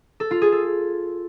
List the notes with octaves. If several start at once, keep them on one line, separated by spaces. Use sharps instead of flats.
A4
F4
G#4
A4